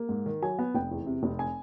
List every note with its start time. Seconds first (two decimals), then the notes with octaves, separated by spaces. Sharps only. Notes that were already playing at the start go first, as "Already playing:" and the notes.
Already playing: A#3
0.09 G#2
0.26 D#3
0.42 F#3 G#5
0.59 B3
0.75 F1 G5
0.91 E2
1.06 C3
1.23 F1
1.39 G#5